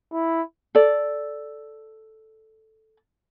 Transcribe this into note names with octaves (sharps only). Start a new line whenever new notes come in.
E4
A4 D5